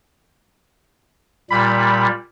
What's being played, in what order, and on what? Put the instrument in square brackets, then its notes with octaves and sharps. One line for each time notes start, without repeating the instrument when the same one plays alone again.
[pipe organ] A#2 G3 [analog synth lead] B5